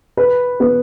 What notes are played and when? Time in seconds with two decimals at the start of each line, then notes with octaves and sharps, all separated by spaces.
0.17 B4
0.60 B3